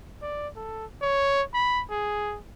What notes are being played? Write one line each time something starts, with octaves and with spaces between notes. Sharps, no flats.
D5
A4
C#5
B5
G#4